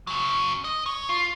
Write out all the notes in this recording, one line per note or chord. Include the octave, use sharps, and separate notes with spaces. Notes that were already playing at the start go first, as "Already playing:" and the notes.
C#3 F#3
D#5
C#5
F4